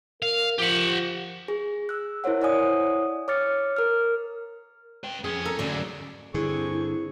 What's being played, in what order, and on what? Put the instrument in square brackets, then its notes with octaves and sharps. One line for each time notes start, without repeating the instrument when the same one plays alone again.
[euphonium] A#4 [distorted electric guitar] F5
[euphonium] F3 [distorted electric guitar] G4 F#5
[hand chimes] G#4
E6 F#6
E4 A#4 C5 C#5 F#5
E4 C#5 D5 F#5 G#5 D#6
C#5 D6 F6 A6 C#7
A#4 F6
[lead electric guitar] B4 G5
[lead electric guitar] F2 [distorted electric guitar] C#4 [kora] G#4
[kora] A4 [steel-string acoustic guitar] A#4
[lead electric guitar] D2 F#3 [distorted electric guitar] G#2 D3 [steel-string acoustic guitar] C#4 C#5 D5
[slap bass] G2 D3 [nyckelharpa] C4 C#6 [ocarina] E4 [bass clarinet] G#4